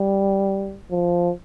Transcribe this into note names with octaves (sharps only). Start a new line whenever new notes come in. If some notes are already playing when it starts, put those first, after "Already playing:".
Already playing: G3
F3